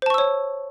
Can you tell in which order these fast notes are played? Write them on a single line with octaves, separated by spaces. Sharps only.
C5 A5 C#6 E6 C#5